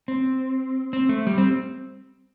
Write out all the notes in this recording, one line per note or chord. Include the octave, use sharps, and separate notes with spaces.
C4
C4
A3
G3
C4